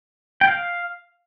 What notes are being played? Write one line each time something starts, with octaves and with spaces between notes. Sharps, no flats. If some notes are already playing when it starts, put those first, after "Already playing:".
G5
F5